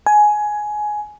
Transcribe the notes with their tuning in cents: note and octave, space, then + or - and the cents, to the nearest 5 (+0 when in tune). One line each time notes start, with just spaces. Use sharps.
G#5 +15